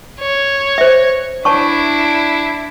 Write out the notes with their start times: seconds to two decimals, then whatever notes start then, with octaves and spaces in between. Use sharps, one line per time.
0.19 C#5
0.78 C5 E5
1.45 D4 E4 C#5 A5 C#6